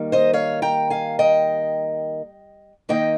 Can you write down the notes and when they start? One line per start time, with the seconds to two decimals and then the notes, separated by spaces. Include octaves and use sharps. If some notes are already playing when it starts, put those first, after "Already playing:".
Already playing: D#3 G3 A#3 D#4
0.12 C5 D#5
0.33 C#5 F5
0.62 G5 A#5
0.90 F5 G#5
1.19 D#5 G5
2.89 D#3 A#3 D#4 D#5 G5